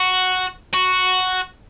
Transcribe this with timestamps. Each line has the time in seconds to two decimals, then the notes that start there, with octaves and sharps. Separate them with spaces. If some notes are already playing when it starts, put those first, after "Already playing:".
Already playing: F#4
0.74 F#4